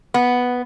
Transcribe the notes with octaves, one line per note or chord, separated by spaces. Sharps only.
B3